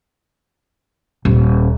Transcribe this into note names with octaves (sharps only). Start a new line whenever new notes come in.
D#1